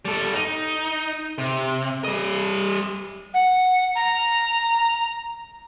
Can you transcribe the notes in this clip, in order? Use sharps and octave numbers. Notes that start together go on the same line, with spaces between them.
G3 A4
D#4
C3
G3 D#5
F#5
A#5